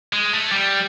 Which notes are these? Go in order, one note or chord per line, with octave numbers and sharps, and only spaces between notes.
G#3
A3
G3